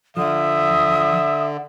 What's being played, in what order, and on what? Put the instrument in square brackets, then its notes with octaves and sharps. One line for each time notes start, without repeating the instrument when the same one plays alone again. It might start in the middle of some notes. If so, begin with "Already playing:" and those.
[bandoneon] D3 [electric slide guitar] F3 [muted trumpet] E5 [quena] D#6